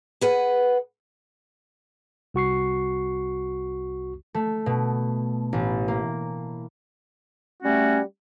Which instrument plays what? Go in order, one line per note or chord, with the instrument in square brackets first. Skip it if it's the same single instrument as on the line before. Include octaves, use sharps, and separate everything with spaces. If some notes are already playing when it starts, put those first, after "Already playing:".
[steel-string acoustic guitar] G#4 B4 F#5
[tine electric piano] C2 F#4 C#6 C7
[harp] A3
B2
A1
A#3
[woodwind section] G3 A3 C#4 F#4